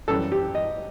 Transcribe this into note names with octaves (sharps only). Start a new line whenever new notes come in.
F#2 E3 G3 A4
G4
D#5